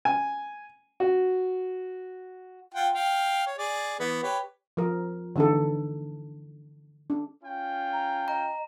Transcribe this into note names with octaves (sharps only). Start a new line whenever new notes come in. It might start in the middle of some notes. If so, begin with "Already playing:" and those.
G#5
F#4
F4 F#5 G5
F5 G5
C#5
G#4 D5
E3 B3 B4
G4 B4 C#5
F3 A#4
D3 E3 D4 D#4 A4
D4
C#4 F4 G5
A#5
D#5 A#5